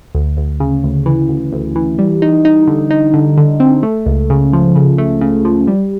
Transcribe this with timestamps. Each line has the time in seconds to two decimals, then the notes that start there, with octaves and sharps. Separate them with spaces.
0.15 D2
0.37 D2
0.60 C#3
0.84 D2
1.06 E3
1.29 D2
1.53 D2
1.76 E3
1.99 G3
2.22 D#4
2.45 D#4
2.68 D3
2.90 D#4
3.14 D3
3.37 D3
3.60 C4
3.83 A3
4.06 C#2
4.30 C#3
4.53 F3
4.76 C#3
4.98 A3
5.21 C#3
5.45 F3
5.67 G3